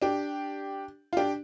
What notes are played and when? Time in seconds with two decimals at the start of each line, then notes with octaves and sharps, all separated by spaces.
0.02 D4 G4
1.13 F4
1.17 D4 G4